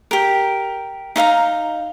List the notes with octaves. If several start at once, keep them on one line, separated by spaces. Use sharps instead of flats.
G4 A#4
D#4 E5 F5 A#5